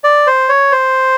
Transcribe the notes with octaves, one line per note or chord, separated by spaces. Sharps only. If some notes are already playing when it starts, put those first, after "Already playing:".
D5
C5
C#5
C5